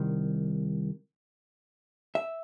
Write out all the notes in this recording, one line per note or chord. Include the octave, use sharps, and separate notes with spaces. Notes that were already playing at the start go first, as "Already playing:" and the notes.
Already playing: C2 D#3
E5